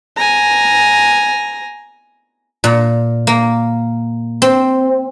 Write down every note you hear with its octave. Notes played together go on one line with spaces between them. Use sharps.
G#5 A#5
A#2
A#3
C4